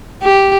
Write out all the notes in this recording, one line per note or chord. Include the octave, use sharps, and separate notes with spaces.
G4